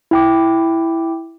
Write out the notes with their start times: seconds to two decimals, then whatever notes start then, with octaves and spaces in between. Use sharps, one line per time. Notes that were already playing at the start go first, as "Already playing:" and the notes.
0.11 E4 G5 D6